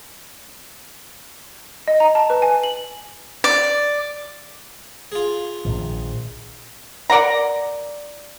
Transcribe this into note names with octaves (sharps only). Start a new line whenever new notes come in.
D#5
A#5
A5
B4
G#5
F#7
D5
F4 G#4
A#1 A#2 D#3
A#4 D5 F#5 A#5